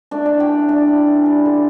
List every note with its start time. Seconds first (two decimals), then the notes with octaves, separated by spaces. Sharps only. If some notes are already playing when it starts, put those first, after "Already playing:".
0.11 A3 D4 D5
0.25 E3 D4 D5
0.40 G4 G5
0.50 A3
0.68 A3 D4 D5
0.88 E4
1.07 E3
1.26 G3
1.46 D3